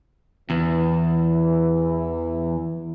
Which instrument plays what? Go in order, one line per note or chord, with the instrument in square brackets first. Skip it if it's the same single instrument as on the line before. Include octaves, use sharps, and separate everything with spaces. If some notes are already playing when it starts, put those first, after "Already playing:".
[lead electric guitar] E2 [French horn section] E3